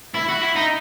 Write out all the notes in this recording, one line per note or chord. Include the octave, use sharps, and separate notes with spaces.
E4
F#4
E4
D#4